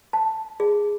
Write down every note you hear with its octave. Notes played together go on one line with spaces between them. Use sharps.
A5
G#4